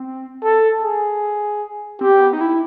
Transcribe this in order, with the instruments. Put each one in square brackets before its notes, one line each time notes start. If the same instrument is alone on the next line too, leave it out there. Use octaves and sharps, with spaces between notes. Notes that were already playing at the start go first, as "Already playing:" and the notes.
Already playing: [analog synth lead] C4
[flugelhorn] A4
G#4
[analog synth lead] C4 [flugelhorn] G4
[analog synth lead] B3
D#4
E4